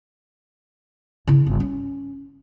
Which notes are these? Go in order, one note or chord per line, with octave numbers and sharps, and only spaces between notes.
C#3 E4
G1
C#4